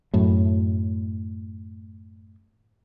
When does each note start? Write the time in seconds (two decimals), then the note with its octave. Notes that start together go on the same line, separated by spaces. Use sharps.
0.13 F#2 A2